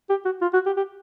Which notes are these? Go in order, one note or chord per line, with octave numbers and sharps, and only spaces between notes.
G4
F#4
F4
F#4
G4
G4